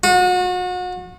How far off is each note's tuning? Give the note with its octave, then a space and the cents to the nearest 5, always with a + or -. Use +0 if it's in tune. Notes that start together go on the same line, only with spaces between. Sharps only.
F#4 -35